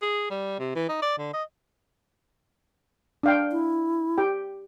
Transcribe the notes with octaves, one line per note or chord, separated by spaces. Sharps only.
G#4
G3
C3
E3
D#4
D5
D3
D#5
D4 F5 G5
E4
G4 G5